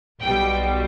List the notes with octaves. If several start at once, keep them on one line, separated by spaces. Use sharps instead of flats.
B1 B2 G3 G5